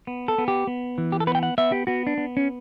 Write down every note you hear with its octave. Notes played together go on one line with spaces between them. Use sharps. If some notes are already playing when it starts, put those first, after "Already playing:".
B3
A4
B3
G4
B3
E3
G4
A4
B3 B4
G5
F#5
B3 E5
G4
B3 F#4
D4
B3
C#4